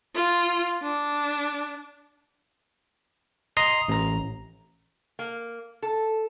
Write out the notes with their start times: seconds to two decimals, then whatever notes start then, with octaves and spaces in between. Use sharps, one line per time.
0.15 F4
0.83 D4
3.57 D#5 A#5 C6 D#6 C7
3.88 A1 A#5
5.19 A#3
5.82 A4